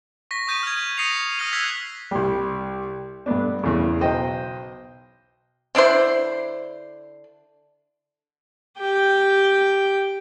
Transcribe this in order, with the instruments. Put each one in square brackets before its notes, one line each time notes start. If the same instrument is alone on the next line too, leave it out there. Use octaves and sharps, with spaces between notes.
[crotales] C#6 A#6 B6
C#6 D#6 G6 A6 D#7
F6 G#6
D#6 A#6 C7 C#7 D#7 F7
D#6 F6 A#6 D#7 F7 G7
E6 F#6 G#6 B6 C7 G7
[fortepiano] C2 G3
G2 A3 B3 D4
E2 C#3
B1 C5 D#5 G5
[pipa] D3 D4 E4 C5
[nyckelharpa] G4 G5